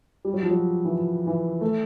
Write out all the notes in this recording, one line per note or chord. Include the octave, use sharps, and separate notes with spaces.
G3
F#3
F3
F#3
E3
F3
E3
A3